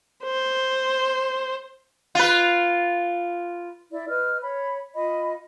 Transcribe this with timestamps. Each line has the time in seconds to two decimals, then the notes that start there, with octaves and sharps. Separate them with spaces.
0.24 C5
2.15 F4 B4
3.92 E4 D5
4.08 B4 D#5 F6
4.43 C#5 B5
4.95 F4 D#5 B5